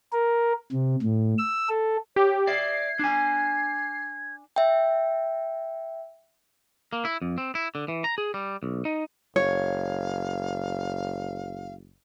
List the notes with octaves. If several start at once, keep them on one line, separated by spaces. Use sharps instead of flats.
A#4
C3
A2
E6
A4
G4 C#5
D5 E5 G#6 C7
D4 G#5
E5 G5
A#3
E4
F2
C4
E4
D3
E3
A#5
G#4
G3
B1
D#4
F#1 C#5 F5